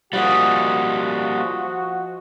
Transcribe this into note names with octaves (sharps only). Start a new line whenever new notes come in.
F3 G3 A#3 F#4 G#4 D#5 F#5